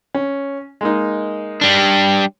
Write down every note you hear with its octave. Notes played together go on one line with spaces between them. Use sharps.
C#4
G#3 A#3 D#4
G3 D4